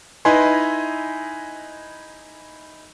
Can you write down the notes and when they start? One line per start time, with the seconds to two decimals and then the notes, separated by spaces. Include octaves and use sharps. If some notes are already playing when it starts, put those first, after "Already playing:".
0.25 D#4 E4 B4 D#5 G#5 C6